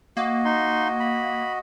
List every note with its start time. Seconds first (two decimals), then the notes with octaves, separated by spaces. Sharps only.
0.17 A#3 F#4 D#5
0.45 D#4 C6
1.00 B5